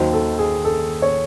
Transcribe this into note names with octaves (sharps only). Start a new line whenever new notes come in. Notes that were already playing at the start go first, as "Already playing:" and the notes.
Already playing: D#2 D#3 F#3 C5
A4
G#4
A4
C#5